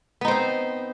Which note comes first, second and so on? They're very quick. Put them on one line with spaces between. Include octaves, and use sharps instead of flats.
B3 D#4 C5 C4